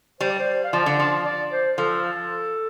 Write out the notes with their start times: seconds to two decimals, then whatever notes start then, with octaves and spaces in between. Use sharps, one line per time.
0.20 G3 C5
0.30 D5
0.39 C5
0.64 F5
0.73 F3 D5
0.86 D3
1.00 F3
1.25 D5
1.52 C5
1.77 F3 A4